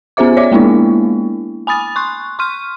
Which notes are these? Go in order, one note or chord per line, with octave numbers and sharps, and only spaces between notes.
B3 C#4 G#4 C5 E5 D6
C#5 D5 E5 D6
G#3 A#3 B3 D4 E4
G#5 B5 D#6 A6
C6 C#6 F#6
C6 C#6 F6 D#7